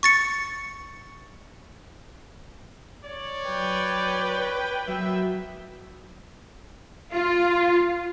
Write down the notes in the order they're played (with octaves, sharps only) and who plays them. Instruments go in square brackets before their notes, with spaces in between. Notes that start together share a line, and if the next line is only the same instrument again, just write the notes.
[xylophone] C#6 A6 C#7
[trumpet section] C#5 D5
[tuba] F#3 [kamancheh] B4 G5
[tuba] F#3 [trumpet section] A#3 B3 E5
[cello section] F4